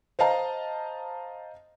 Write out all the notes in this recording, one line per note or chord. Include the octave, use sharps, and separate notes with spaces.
C5 D#5 F5 A5 A#5